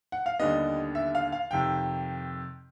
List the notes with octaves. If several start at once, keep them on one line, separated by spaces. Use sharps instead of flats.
F#5
F5
D#2 D3 G3 B3 D#5
E5
F5
F5
F2 C3 D#3 G5